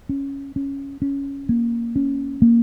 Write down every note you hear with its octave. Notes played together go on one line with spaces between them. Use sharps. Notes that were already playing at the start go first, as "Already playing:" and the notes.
C#4
C#4
C#4
A#3
C#4
A#3